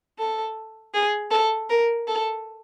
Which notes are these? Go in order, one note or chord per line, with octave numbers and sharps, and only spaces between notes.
A4
G#4
A4
A#4
A4